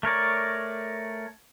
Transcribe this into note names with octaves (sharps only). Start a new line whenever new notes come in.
A3 A#4 C#5 D5